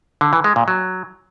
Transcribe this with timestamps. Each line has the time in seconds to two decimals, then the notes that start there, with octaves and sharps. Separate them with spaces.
0.21 D3
0.33 E3
0.44 G#3
0.56 A#2
0.68 F#3